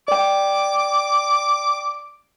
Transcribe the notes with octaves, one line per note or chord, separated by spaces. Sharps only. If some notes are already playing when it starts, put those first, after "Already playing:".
D5 G5 D6